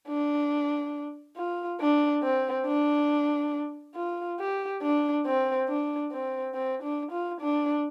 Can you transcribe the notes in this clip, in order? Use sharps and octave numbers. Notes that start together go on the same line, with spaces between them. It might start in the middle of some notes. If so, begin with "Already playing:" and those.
D4
F4
D4
C4
D4
F4
G4
D4
C4
D4
C4
C4
D4
F4
D4